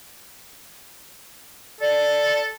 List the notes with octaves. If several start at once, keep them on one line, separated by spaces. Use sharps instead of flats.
A4 D5